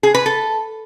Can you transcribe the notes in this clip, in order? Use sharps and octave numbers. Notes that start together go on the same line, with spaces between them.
G#4
B4
A4